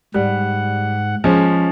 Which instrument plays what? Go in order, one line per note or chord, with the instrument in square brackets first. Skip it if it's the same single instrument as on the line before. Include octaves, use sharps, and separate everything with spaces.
[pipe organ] G#2 F#5 [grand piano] G3
[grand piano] F3 G#3 C#4